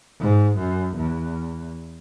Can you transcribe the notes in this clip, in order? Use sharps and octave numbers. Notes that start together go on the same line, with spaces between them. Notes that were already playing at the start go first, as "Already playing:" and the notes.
G#2
F#2
E2